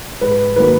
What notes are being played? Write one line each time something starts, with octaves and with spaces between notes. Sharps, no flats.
G#2 B4
D#3 F#3 A#3 B4